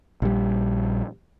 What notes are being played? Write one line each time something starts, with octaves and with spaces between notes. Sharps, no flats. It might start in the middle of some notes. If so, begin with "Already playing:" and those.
A#1 G3